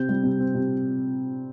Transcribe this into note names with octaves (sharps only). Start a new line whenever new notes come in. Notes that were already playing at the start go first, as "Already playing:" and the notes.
Already playing: C3 C4 G6
G3
C3
C4
C3